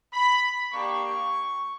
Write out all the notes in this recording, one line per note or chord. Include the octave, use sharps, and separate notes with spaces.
B5
A#3 D4 G4 C#6